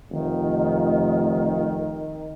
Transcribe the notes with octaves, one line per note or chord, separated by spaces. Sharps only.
F1 D#3